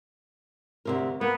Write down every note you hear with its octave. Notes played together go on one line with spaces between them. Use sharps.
D2 C3 A#4
A#3 B3